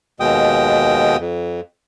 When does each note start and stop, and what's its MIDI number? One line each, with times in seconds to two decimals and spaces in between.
0.20 1.17 39
0.20 1.17 47
0.20 1.17 56
0.20 1.17 79
0.20 1.17 87
1.20 1.60 41